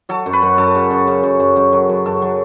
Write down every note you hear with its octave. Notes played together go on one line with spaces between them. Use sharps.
F#3 A4
F#2
B4
F#2
F#2 A4
C#3
F#2
C#3
F#2
F#2
F#2
F#3
F#2
F#2 A4
F#3